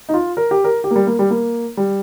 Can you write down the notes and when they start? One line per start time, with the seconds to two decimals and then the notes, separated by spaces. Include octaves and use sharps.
0.09 D#4
0.14 F4
0.37 A#4
0.51 G4
0.64 A#4
0.84 G4
0.91 A#3
0.96 G3
1.07 A#3
1.19 G3
1.31 A#3
1.77 G3